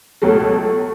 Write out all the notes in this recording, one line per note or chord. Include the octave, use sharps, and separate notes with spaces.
C#2 B2 F#3 A3